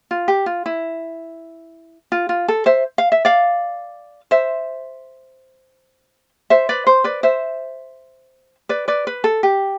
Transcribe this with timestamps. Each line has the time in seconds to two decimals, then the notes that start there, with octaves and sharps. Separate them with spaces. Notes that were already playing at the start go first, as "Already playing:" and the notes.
0.11 F4
0.28 G4
0.46 F4
0.66 E4
2.12 F4
2.29 F4
2.48 A4
2.66 C5 E5
2.98 F5
3.12 E5
3.25 D5 F5
4.31 C5 E5
6.50 C5 E5
6.69 B4 D5
6.87 C5
7.04 B4 D5
7.23 C5 E5
8.69 B4 D5
8.88 B4 D5
9.07 B4
9.24 A4
9.43 G4